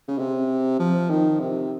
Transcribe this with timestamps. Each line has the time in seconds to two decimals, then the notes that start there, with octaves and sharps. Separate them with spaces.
0.08 C#3
0.19 C3
0.79 F3
1.10 D#3
1.40 C3